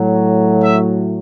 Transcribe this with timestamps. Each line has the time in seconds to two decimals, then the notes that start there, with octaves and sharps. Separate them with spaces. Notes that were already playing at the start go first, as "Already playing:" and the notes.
Already playing: A2 F#3 A3
0.62 E5